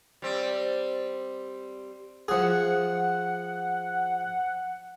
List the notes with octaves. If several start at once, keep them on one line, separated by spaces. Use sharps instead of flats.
G3 C4
F3 G#4 F#5